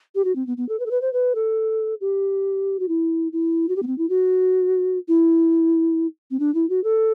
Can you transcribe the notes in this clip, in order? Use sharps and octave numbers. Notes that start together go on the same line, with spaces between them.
G4
F#4
C4
B3
B3
A4
B4
A4
B4
C5
B4
A4
G4
F#4
E4
E4
F#4
G4
B3
C4
E4
F#4
E4
C4
D4
E4
F#4
A4